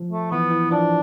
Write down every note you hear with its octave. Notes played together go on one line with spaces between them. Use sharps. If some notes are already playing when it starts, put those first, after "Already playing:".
Already playing: F3
A3
E3 B3
E3
F3 D4